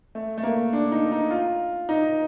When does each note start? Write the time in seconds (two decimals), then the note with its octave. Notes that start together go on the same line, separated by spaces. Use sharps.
0.15 A3
0.38 A3
0.43 A#3
0.73 D4
0.92 D#4
1.12 D#4
1.31 F4
1.89 D#4